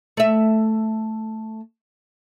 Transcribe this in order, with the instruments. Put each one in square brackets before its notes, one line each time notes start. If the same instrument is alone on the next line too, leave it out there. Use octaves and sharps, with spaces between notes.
[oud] A3 E5